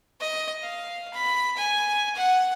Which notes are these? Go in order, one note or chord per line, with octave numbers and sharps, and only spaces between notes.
D#5
F5
B5
G#5
F#5